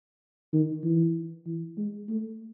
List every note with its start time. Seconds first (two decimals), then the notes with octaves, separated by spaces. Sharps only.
0.53 D#3
0.83 E3
1.46 E3
1.78 G#3
2.09 A3